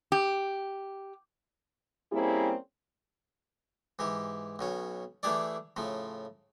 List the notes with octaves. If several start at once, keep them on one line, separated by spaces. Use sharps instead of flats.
G4
G3 A#3 C4 C#4 E4 G#4
G#2 E3 G4
B1 B2 C#4
E3 A3 D4 G4 G#4 D5
A2 C#3 F3